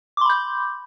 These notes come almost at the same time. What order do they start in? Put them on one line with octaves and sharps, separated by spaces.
D6 C6 B5 G6